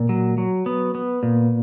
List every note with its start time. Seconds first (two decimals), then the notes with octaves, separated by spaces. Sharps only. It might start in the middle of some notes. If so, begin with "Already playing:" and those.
Already playing: A#2
0.09 F#3
0.38 F#3
0.66 B3
0.95 B3
1.23 A#2